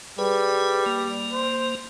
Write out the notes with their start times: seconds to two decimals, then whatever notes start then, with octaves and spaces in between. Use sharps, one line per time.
0.19 G3 G#4 B4
0.86 A#3
1.33 C5